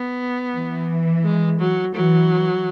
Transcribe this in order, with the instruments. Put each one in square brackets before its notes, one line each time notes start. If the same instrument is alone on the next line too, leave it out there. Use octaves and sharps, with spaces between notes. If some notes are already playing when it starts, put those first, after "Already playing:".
Already playing: [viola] B3
[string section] E3
[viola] G#3
F#3
[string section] E3 [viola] F#3